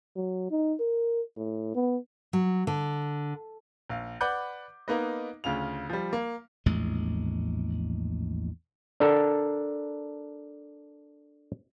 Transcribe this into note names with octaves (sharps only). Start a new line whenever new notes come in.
F#3
D#4
A#4
A2
B3
F#3
D3
A#1 F5
B4 D5 F#5 B5 D6 G6
A#3 B3 D#4 B4 D#5
D2 C#3 F4 F7
F3 G3
A#3
A#1 E2 A2 G#3
D4 A4 A#4